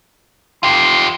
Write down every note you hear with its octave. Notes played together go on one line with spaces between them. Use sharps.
F4 G4 C6